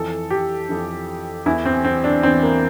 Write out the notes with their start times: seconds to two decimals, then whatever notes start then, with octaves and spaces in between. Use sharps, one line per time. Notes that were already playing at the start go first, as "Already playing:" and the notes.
Already playing: F2 E3 A4
0.30 G4
0.69 F2 E3
1.46 E2 E3 E4
1.66 C4
1.84 C4
2.04 D4
2.23 E2 E3 C4
2.43 A#3